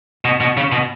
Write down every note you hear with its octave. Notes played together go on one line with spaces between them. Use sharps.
B2
B2
C#3
B2